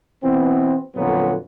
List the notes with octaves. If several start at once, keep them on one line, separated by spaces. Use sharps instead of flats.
B2 E3 B3 C4
F2 A#2 D3 F#3 B3 F#4